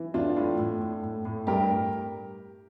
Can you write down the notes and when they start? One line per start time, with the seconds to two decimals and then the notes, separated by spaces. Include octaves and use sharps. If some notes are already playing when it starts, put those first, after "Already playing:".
Already playing: E3
0.14 A2 D4 F4
0.36 A2
0.59 A2
0.81 A2
1.03 A2
1.25 A2
1.47 G2 G4 A#4